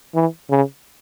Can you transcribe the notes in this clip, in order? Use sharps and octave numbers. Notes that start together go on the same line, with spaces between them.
E3
C#3